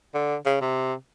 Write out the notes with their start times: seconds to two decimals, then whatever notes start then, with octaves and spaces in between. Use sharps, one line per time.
0.14 D3
0.45 C#3
0.61 C3